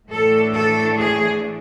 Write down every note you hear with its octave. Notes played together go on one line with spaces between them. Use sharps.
A2 E3 A3 D4 A4
A4
G#4